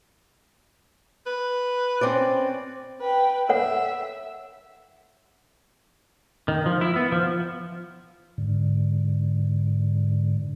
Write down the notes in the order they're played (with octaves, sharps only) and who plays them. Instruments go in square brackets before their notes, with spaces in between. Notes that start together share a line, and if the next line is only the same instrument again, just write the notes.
[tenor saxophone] B4
[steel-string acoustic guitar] C4 C#4 D5
[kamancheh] B4 G5
[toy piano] A4 C#5 F#5 [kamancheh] E5
[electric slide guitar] D#3
F3
E4
B3
F3
[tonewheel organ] G#2 D3